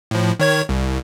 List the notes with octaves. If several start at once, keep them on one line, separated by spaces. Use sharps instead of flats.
A2 F3
D#3 C#5 G#6
C2